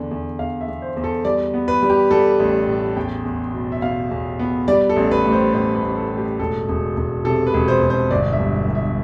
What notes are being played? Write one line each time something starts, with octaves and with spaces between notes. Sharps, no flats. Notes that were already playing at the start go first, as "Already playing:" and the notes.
Already playing: E2 D3
E2
E2 F5
E5
E2
C5
E2
A4
G3 D5
B3
B4
G3
G4
G3 A4
A1
A2
E2 G5
E2
B2
E5
B2 F5
E2
B3
G3 D5
A4
A1
B4
A2
C5
A1 C5
B4
A1
A4
A2
G4
E1 A4
E1
E1
C3 A4
B4
E1
C5
E1
C5
G1 D5
E5
G2
G2
E5